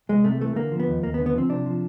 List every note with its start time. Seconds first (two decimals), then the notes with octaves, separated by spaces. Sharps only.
0.09 C2 G#3
0.24 C3 A3
0.41 E3 A3
0.56 D3 A#3
0.72 F3
0.80 B3
0.87 D#2
1.03 D#2 A#3
1.14 B3
1.19 D3
1.26 B3
1.35 F3 C4
1.49 C3 D4
1.66 F3